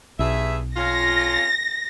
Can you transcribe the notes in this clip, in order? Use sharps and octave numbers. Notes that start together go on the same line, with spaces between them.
B1 G2 G#4 E5
F2 C#4 F4 A#6